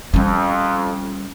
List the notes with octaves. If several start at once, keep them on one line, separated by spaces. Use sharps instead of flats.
F2 G3 C#4